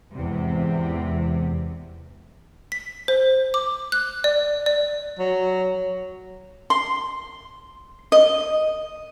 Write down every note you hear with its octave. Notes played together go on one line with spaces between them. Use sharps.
E2 G#2 C3
B6
C5
D6
F#6
D5
D5
F#3
C6
D#5